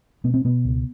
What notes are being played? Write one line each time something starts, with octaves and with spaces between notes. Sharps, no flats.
B2 B3
C4
B2 B3
C#2